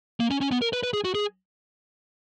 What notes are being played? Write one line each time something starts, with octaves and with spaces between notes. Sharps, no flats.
A#3
C#4
C#4
B3
A#4
B4
B4
G#4
F#4
G#4